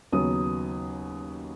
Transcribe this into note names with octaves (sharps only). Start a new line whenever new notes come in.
D#2 C#3 F#3 B3 D#6